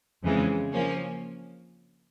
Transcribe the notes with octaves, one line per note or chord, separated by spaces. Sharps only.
F2 C#3 E3 G#3
F3 A#3 C#4